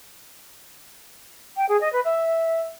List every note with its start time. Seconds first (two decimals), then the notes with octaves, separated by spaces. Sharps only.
1.57 G5
1.69 G#4
1.81 D#5
1.92 B4
2.04 E5